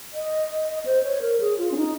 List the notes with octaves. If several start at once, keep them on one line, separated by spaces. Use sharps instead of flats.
D#5
C5
C#5
A#4
G#4
F4
C#4
D#4